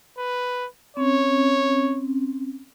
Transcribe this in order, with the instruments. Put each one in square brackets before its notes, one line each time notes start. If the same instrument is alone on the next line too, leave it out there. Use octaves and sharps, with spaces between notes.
[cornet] B4
[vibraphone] C4 C#4 [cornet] C#5